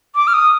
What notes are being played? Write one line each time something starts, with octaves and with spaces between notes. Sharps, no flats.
D6
F6
D#6